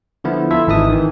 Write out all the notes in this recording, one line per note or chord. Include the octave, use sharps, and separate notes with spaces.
D3 F3 B3 E4
E4 F4 A4 E5
G#1 E3 D#4 E5 A5 D#6
D#3 E3